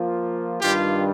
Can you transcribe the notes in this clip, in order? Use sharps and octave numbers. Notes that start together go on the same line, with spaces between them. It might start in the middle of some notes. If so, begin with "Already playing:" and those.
Already playing: F3 A#3 F4
G2 D#3 G3 D4 F4 G4